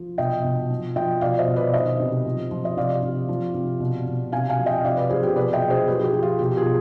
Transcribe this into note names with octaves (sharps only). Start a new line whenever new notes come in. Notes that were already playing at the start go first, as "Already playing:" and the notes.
Already playing: F3
B2 D#5 G5
B2
F3
F3 D#5 G5
B2 D5 F5
C5 D#5
B2
B4 D5
D#3 C5 D#5
C3
F3
F3
D#5
C3 D5 F5
C3
F3
C3
B2
B2
C3 F5 G#5
F5 G#5
F3
D#5 G5
C3 D5 F5
B4 D5
F3 G#4 C5
G4 B4
B2 B4 D5
D#5 G5
B2
G#4 C5
F3 G4 B4
G#4
G4
F3
F4
B2 G4
F4 G#4
B2